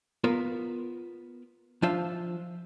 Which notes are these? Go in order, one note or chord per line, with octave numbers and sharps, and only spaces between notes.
B3 F4 A#4 B4
F3 D4 F4 C5 E5 F5